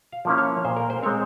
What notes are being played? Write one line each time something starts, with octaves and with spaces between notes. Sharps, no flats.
F5
F3 A#3 C#4 E4
C#5
A#2 C5
A#4
C5
G#3 C4 C#5